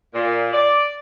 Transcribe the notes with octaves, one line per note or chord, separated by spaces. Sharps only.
A#2
D5